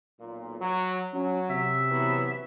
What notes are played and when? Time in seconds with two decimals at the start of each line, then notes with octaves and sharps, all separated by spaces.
0.19 B1 A#2
0.60 F#3
1.13 F#3 C#4
1.50 C3 E5
1.90 E3 F#3 B3